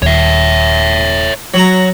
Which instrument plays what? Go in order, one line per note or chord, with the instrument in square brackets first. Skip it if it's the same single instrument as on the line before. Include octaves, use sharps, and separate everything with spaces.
[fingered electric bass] D#1 D#2 [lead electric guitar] C#5 E5
[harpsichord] F#3 A#5